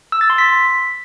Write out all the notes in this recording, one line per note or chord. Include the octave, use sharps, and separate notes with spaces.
E6
A6
C6
B6